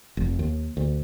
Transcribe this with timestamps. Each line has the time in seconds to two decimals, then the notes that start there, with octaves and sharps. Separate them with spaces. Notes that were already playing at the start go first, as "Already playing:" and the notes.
0.17 F1
0.39 D#2
0.77 D2